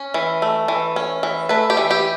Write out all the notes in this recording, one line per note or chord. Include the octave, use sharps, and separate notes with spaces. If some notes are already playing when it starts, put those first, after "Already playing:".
Already playing: C#4
E3
A3
E3
C#4
E3
A3 B4
G4
E3
G4